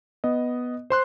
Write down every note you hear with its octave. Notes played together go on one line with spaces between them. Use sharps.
B3 D#5
C5 C6 F#6